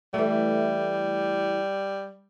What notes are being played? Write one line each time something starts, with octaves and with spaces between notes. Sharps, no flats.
E3 G3 A3